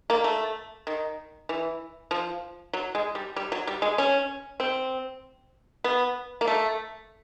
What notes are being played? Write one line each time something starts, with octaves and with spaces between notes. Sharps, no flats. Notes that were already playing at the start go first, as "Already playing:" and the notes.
A#3
A3
D#3
E3
F3
F#3
G#3
G3
G3
F#3
G3
G#3
C#4
C4
B3
A#3
A3